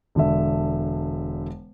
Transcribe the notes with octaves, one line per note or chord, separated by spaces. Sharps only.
E1 D3 E5